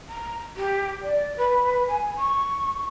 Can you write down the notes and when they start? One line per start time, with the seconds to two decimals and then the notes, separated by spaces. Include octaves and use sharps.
0.08 A#5
0.56 G4
1.01 D5
1.36 B4
1.87 G#5
2.17 C#6